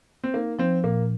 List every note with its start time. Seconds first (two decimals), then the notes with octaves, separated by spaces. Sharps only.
0.24 C4
0.34 A#3 D#4
0.59 F3 C4
0.84 A#2 A#3